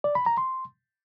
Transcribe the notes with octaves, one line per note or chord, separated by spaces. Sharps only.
D5
B5
A#5
C6